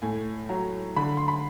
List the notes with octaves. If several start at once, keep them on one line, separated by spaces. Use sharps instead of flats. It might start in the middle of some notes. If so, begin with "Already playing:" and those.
A2 G#5
F#3 A#5
D3 B5
C6
B5